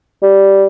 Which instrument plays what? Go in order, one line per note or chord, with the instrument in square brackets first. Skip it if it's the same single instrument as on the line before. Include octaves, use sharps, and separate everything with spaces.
[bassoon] G3